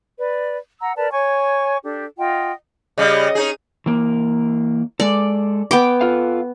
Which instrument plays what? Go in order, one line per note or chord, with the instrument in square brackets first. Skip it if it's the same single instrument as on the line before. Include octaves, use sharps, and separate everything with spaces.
[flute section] B4 D5
F#5 A#5 E6
A#4 B4 D5 A5
C#5 G#5 C#6 G#6
D4 G4 A4
F4 D#5 F#5 G5
[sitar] C#3 G3 [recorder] D#5
[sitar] C#4 D#4 G#4
[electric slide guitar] E3 A#3
[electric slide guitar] G#3 A4 [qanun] D5
[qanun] B3 G5 D6
[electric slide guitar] F4 A4 F5